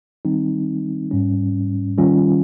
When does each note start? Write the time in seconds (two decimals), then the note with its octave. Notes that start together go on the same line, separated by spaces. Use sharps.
0.25 D#3 G3 C4 D#4
1.11 G#2 G3 C#4
1.98 D#3 G3 C#4 F4